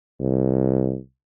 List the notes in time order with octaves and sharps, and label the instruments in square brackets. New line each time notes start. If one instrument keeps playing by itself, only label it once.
[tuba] C2